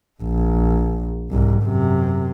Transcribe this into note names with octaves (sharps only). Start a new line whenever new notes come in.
A#1
C2 G#2
F#2 C3